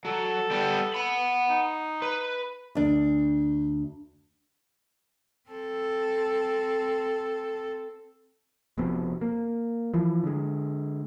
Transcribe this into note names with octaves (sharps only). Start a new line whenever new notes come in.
F#3 A4
G3 B3
F#5 B5
D#4
B4
D2 D4
C4 A4
F1 F2 B2 C4
A#3
E3 F3
D3 G#3